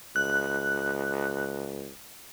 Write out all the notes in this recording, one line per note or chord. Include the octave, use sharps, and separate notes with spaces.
C#2 F#6